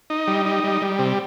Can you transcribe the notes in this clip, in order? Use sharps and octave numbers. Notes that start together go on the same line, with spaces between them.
D#4
G3
D#4
G3
G3
C3